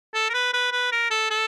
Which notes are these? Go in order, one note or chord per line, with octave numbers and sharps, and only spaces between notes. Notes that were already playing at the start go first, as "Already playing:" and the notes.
A4
A#4
B4
B4
B4
A#4
A4
A4